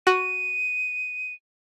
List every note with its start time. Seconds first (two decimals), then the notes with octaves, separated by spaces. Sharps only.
0.07 F#4 D#7